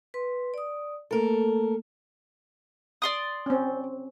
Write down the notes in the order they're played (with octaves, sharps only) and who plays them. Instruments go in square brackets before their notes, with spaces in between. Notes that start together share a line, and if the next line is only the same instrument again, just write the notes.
[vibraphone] B4 C6
D5 D#6
[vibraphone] A3 A#3 [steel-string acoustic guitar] A4 A#4
[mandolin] D5 C6 D#6
[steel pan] C4 C#4